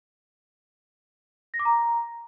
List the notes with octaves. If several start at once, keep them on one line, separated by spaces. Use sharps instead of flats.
A#6
D6
A#5